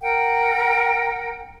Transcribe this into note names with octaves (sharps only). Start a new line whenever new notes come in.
A#4 F#5 G5